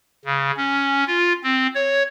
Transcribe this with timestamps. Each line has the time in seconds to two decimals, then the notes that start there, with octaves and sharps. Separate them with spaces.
0.25 C#3
0.57 C#4
1.07 F4
1.44 C4
1.75 C#5